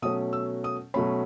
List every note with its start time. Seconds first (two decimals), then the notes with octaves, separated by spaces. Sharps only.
0.02 B2 F#3 A3 C#4 D#6
0.33 E6
0.64 D#6
0.94 B2 F#3 A3 C#4 B5